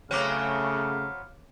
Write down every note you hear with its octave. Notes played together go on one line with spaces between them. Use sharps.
C#3 F#3 A3 B3 C4 C#5 F5 D6